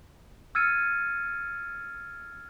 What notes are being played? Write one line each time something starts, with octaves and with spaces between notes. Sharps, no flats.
E6 F6 G#6 A6 C#7 D#7